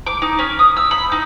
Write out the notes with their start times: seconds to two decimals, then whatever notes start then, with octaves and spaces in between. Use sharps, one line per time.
0.07 D6
0.22 D#4
0.39 C#4
0.59 D#6
0.77 E6
0.91 B5
1.12 D#4